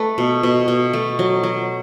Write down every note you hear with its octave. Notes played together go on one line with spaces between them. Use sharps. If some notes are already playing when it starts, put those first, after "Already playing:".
Already playing: A3 B4
B2
B2
B2
A3
F#3
F#3